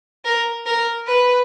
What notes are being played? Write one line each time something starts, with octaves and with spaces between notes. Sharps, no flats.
A#4
A#4
B4